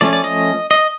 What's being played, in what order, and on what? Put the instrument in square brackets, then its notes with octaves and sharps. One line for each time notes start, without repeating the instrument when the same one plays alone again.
[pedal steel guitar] F3 A3 C#4 D5
D5
D#5
D#5